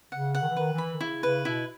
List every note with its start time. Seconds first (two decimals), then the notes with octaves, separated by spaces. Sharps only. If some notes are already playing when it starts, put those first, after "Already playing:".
0.12 C#3 F#5
0.35 F#5
0.41 D#3
0.48 E3
0.56 D#3 B4
0.71 E3
0.78 B5
0.93 D#3
1.00 C#3 E4
1.23 C#3 B4
1.45 B2 E4